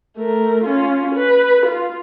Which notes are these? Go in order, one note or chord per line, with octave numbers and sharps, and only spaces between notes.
A3 A#4
C#4 F4
B4
F4